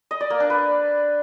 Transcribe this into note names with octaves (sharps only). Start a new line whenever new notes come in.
D#5
D5
A#3
D4
B4